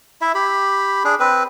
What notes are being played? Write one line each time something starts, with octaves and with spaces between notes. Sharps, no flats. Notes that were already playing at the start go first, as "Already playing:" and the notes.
E4 E5
G4 B5
D4 G#4
C4 B4